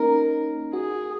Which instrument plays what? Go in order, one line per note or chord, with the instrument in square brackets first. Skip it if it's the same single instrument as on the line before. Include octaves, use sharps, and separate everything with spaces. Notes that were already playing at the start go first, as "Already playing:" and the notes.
Already playing: [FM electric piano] A#3 C#4 D#4 [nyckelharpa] A#4
[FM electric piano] F#4 [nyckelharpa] G#4